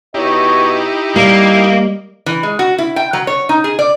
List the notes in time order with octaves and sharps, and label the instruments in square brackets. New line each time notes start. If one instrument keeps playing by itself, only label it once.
[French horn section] B2 C#5 D#5 [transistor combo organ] D#4 E4 G4
[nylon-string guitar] G3 [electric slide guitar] A#3 [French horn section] D#5
[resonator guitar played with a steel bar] E3
G#3
F#4
E4
G5
F#3
C#5
D#4
G#4
D5